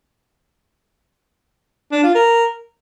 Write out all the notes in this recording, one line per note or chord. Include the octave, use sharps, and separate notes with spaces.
D4
F4
A#4